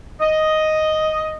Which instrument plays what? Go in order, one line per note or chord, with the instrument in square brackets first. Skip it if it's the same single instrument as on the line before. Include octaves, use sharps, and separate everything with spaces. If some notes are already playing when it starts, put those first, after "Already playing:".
[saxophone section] D#5